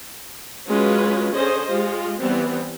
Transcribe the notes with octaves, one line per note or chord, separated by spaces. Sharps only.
F#3 G#3 C#4 F4 B4
D3 C#4 G#4 C5 D#5
G#3 F4 G4
E3 G3 B3 C4